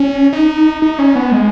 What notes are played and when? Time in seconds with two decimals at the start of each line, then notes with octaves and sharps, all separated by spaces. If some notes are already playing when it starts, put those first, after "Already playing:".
Already playing: C#4
0.33 D#4
0.82 D#4
0.99 C#4
1.15 B3
1.32 G#3